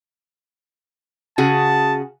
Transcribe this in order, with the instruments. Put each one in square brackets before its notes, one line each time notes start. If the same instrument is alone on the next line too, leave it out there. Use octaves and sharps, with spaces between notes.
[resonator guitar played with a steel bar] C#3 F#4 G#4 [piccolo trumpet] A5